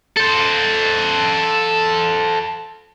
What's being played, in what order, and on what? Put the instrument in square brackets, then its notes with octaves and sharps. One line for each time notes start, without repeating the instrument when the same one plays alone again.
[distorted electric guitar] A4 C5